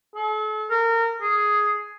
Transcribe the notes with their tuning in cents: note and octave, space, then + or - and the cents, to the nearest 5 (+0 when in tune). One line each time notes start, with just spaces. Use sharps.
A4 -40
A#4 -25
G#4 +5